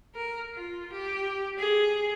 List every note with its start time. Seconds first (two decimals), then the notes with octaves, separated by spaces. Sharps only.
0.15 A#4
0.55 F4
0.92 G4
1.58 G#4